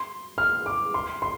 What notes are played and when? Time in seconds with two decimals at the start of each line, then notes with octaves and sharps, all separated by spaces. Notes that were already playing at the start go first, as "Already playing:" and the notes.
Already playing: C6
0.38 F6
0.66 D6
0.94 C6
1.22 C6